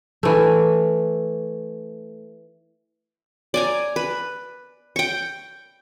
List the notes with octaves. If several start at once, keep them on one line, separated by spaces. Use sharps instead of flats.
E3 A3
D5 G#5 A#5
B4
G5 C#6